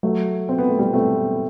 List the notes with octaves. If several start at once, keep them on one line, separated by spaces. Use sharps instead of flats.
F#3 A3
C4
B3
A3
G3 B3
A3 C4